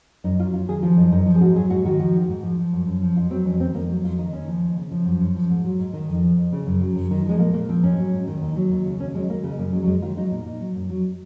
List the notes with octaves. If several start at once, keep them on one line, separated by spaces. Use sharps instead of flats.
F#2 D#4
F#3 F4
F#2 F4
D#3 G#4
F3 F4
F#2 D#4
F#2 D#4
F3
G#4
G#2 F#4
F#3 G#4
G#2 F#4
D#3 F#4
F3 F#4
G#2
G#2
F3
F3
F#2
F#2
F3
F2 F4
F#3 C4
F2 C#4
D#3 C4
F2 A#3
F#3
F2 F4
D#3 D#4
D#2 C#4
F3
D#2
C#3
F3
F#2
F#2
F3
G#2
F#3
G#2
D#3
F2
F3
F2
C#3
F#2
F#3
F#2
D#3
F3 G#3
A#2 A#3
A#2 A#3
F3 C4
G#2 C#4
F#3
G#2
D#3
D#2
F#3
D#2
C#3
D#2 C#4
F#3 G#3
D#2 A#3
C#3 G#3
F#2 A#3
F#3 G#3
F#3
F#2 G#3
D#3 F4
F#3 D#4
A#2
A#2
F#3
F#2
F#3